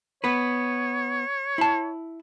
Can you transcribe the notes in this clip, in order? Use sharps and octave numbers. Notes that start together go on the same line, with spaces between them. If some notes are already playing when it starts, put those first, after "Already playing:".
B3 B4 C#5
E4 A5